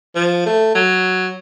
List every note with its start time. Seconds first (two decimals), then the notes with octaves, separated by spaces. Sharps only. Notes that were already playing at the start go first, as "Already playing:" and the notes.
0.15 F3
0.46 A3
0.75 F#3